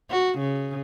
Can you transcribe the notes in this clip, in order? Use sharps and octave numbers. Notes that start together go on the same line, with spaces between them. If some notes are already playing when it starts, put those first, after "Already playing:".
F#4
C#3